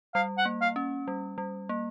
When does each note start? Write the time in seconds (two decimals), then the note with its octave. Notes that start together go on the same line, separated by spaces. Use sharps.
0.15 G3 F5
0.38 F#5
0.45 A#3
0.61 F5
0.76 C#4
1.08 G3
1.38 G3
1.69 A#3